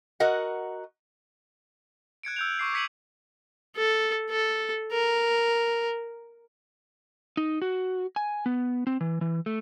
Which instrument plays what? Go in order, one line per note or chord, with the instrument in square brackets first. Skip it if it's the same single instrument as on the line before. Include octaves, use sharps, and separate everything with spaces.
[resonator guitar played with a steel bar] F#4 A#4 D#5 F#5
[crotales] F#6 G#6 C#7 D7
E6 G6 F7
C#6 D6 C7
D6 G#6 B6 C#7 D#7 F#7
[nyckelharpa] A4
A4
A#4
[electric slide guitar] D#4
F#4
G#5
B3
C4
E3
E3
A3